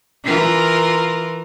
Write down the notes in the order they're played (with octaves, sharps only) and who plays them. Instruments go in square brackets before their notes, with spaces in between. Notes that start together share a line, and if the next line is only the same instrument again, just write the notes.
[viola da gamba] E3 F4 A#4